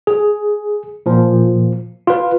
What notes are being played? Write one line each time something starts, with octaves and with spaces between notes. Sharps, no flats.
G#4
A#2 F3
F4 B4